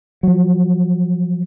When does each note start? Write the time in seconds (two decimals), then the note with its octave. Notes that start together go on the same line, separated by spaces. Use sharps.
0.23 F3 F#3